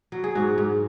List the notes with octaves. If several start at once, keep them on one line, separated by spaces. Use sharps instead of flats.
F#3
G#4
G#2 F#4
G#2